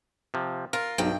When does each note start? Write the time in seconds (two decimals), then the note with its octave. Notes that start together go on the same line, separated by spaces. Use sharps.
0.34 C3 F3
0.73 F4 A#4
0.98 B1 G2 D#3 G5